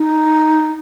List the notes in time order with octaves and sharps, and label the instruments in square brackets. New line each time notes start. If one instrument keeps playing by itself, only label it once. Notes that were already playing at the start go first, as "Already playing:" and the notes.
Already playing: [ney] D#4